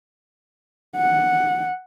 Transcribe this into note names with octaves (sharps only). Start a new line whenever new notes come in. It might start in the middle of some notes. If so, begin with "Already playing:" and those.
F#5